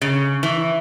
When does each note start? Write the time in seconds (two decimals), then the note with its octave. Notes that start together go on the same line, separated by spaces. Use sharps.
0.02 C#3
0.43 E3